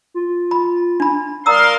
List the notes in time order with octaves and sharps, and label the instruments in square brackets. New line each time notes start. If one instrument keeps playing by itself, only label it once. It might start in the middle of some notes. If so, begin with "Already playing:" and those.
[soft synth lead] F4
[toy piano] B5
D4 B5
[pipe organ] A#4 F5 C6 [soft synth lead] D5 [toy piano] A#5 D#6 E6